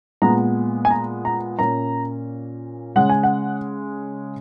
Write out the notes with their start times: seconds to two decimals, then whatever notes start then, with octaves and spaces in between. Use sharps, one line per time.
0.22 A#2 G#3 B3 A#5
0.85 G#5
0.90 A#5
1.25 A#5
1.59 A#2 A#3 C#4 A#5
2.96 C#3 G#3 C#4 F#5
3.09 G#5
3.23 F#5